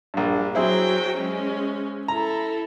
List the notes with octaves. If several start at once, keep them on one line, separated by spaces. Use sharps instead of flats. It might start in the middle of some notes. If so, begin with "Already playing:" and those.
A#1 G2
F#3 C4 E4 G#4 G5
G#3 C#4
E4 A4 A#5